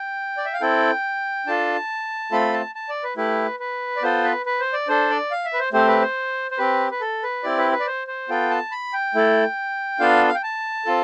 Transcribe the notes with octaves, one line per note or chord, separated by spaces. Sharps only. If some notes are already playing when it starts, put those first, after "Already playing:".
Already playing: G5
D5
E5
F5
C4 E4 A4 G5
D4 F4 A4 A5
A3 C4 F4 A4 B5
A5
A5
D5
B4
A3 E4 G4 B4
B4
D5
B3 F4 A4 C5
B4
B4
C5
D5
D4 A4 C5
D5
F5
E5
B4
C5
A3 C4 G4 C5
B4
C5
C5
C4 G4 B4
B4
A4
B4
C4 E4 G4 D5
B4
B4
D5
C5
C5
B3 F4 A4 G5
A5
B5
G5
A3 E4 A4
B3 D4 F4 A4 F5
F5
G5
A5
C4 F4 A4